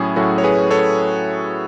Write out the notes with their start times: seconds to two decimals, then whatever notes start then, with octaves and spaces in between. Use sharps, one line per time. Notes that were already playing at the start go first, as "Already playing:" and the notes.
Already playing: A2 F#3 C#4 E4 G#4
0.16 A2 F#3 C#4 E4 F#4 A4
0.38 C#5
0.43 G#4 B4
0.70 A4 C#5